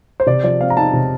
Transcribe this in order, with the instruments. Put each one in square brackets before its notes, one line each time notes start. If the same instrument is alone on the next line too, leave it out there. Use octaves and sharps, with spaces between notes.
[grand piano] C5
C3 D5
F3 D5
C4 F5
A#5
D#4 A5
C3